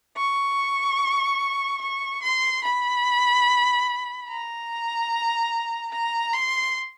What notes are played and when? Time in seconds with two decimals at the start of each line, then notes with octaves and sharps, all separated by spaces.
0.17 C#6
1.81 C#6
2.22 C6
2.64 B5
4.28 A#5
5.92 A#5
6.33 C6